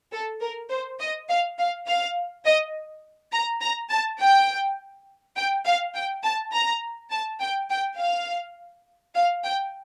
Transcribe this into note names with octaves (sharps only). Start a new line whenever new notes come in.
A4
A#4
C5
D#5
F5
F5
F5
D#5
A#5
A#5
A5
G5
G5
F5
G5
A5
A#5
A5
G5
G5
F5
F5
G5